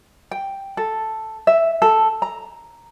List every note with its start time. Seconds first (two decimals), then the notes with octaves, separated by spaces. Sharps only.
0.31 G5
0.77 A4
1.47 E5
1.82 A4
2.22 A#5